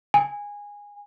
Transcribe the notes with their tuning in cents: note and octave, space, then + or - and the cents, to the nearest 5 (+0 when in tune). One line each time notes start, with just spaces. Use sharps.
G#5 -15